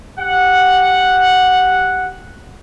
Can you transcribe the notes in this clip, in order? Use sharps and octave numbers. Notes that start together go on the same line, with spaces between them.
G4 F#5